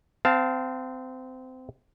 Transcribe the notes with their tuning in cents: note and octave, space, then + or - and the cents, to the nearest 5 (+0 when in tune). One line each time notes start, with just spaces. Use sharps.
C4 -25 F5 +0 A5 +0